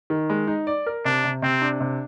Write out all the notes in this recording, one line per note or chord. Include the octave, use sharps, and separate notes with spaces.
D#3
G#3
D#4
D5
A#4
C3 D4
C3
C3 C4
D4
C3